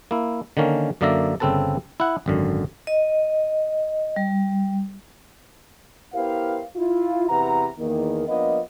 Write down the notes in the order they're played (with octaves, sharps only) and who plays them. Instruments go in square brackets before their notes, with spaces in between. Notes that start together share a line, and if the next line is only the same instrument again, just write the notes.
[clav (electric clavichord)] A#3 E4
D3 D#3 A#3 C#4
F#2 D3 A#3 D5 E5 A#5
G1 C#3 C4 A4 B4 A5
E4 F#5
G#1 F#2 D3
[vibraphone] D#5
G3
[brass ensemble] B3 E4 G4 A#4 C5 F5
E4 F4
E2 C3 E4 B4 F#5 A#5
E2 D#3 A#3
F3 A#3 B3 D4 D#5